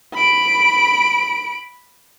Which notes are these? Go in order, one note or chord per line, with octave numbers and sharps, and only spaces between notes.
B5 D7